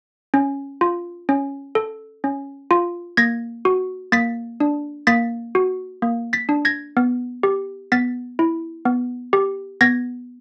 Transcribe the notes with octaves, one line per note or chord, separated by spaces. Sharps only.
C#4
F4
C#4
A4
C#4
F4
A#3 G#6 A#6
F#4
A#3 A6 B6
D4
A#3 A6 B6
F#4
A#3
A6 B6
D4
G#6 A#6
B3
G4
B3 A6 B6
E4
B3
G4
B3 G#6 A#6